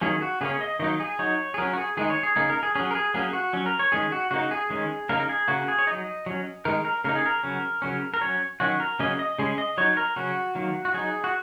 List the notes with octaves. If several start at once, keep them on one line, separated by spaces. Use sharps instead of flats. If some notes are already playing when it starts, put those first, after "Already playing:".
D#3 F#3 A#3 C#4 G#4
F#4
C#3 A#3 C#4 G#4
D#5
D#3 F#3 A#3 D#4 D#5
G#4
F#3 D#4 C#5
G#4
F#3 C#4 A#4
F#4
G#4
D#3 G#3 D#4 G#4
C#5
G#4
C#3 A#3 D#4 G#4
A#4
G#4
F#3 C#4 G#4
A#4
G#4
F#3 A#3 C#4 G#4
F#4
F#3 C#4
A#4
C#5
D#3 G#3 C#4 G#4
F#4
C#3 A#3 D#4 F#4
G#4
D#3 G#3 C#4
C#3 A#3 D#4 A#4
A#4
G#4
C#3 A#3 C#4 F#4
G#4
C#5
F#3 D#4 D#5
F#3 C#4
D#3 G#3 D#4 A#4
A#4
C#3 A#3 D#4 A#4
G#4
A#4
C#3 F#3 C#4
C#3 F#3 C#4
A#4
F#3 C#4 C#5
D#3 F#3 C#4 F#4
A#4
C#3 F#3 A#3 C#4 D#5
D#5
C#3 G#3 C#4 G#4
D#5
F#3 D#4 C#5
A#4
C#3 F#3 C#4 F#4
D#3 F#3 A#3
F#4
F#3 D#4 G#4
F#4